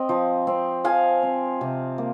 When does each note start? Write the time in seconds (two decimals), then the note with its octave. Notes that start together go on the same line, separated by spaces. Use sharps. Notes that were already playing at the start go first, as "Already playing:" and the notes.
Already playing: C4 D#5
0.09 F3
0.47 C4
0.84 F3 F5 G#5
1.23 C4
1.61 C3
1.98 A#3